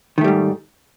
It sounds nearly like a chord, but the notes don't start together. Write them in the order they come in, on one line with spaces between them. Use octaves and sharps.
D#3 A3 G3 G#2